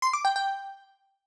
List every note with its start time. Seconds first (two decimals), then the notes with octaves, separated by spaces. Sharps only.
0.02 C6
0.13 D6
0.25 G5
0.36 G5